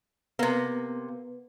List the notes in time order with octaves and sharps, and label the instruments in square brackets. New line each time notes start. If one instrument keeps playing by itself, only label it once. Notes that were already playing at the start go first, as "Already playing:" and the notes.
[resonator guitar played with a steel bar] C3 A#3 [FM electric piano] B3